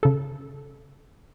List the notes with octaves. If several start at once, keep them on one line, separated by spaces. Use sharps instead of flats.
C#3 A4